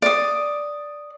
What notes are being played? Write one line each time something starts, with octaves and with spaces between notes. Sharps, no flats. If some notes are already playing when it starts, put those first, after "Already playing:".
D5 D#6